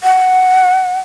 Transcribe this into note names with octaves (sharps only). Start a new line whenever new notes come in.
F#5